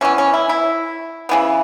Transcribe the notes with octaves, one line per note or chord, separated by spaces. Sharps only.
E3 B3 C#4
C#4
E4
E4
C#3 E3 B3